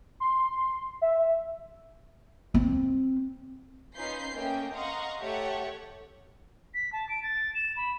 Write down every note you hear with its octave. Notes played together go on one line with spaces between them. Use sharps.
C6
E5
C4
C#4 D#4 F4 B4 G6 C7
A3 A#3 C#4 D#5 G5
D#5 F5 F#5 A#5 C6 C#6
A3 G4 A4 C#5 F#5
B6
A5
D7
A6
E7
B5